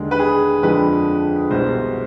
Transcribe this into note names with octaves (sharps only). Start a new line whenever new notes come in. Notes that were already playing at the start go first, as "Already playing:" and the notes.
Already playing: D#2 D3 G#3
B4
G#4
F2 D3 F3 G#3 B4
C2 B2 G#3 C5